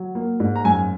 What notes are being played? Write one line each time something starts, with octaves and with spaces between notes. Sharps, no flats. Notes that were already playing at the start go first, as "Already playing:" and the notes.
Already playing: F#3
A#3
G#2
A#5
F#2 G#5